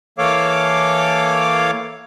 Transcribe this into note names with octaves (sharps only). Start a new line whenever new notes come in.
E3 A#3 A4 C#5 F5 D6